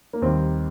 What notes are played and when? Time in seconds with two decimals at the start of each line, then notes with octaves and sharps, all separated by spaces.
0.13 A#3
0.22 D#2 D#3 G3 C4